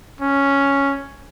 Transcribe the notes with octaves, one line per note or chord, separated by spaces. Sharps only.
C#4